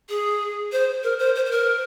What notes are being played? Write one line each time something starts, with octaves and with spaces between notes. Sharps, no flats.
G#4
C5
A#4
C5
C5
C5
A#4